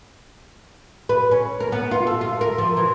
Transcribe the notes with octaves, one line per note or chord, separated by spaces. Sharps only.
B4
C#4
A#4
B3
F4
A4
F4
A#4
F3
E3